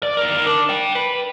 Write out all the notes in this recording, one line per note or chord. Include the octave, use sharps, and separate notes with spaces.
D5
D#2 A#4
D4
D5 G5
B4